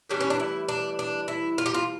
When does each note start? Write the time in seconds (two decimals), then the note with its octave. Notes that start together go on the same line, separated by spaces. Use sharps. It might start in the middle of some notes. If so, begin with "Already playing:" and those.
0.09 A2 E3 G3 C#4 D4
0.20 C#4
0.30 D4
0.40 E4
0.69 D4
0.99 D4
1.28 E4
1.58 F4
1.66 G4
1.74 F4